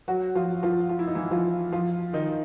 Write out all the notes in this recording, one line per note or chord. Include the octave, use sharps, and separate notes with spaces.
F#3 F#4
F3 F4
F3 F4
F4
E4
D#4
E3 E4
F3 F4
F3 F4
D#3 D#4